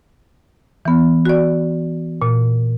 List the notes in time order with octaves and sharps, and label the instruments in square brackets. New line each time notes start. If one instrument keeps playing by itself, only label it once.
[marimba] E3 B3
F#4 D5
A#2